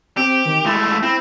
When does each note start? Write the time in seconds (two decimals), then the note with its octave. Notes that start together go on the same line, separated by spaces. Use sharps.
0.17 C4 G4
0.45 D#3
0.66 G#3 A3 E4
1.03 C4 E4